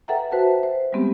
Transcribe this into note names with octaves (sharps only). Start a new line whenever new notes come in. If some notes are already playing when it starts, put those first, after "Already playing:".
A4 B4 E5 F#5 G5 A#5
F#4 B4 C5 E5 F#5 A5
C5
G3 G#3 B3 C4 G4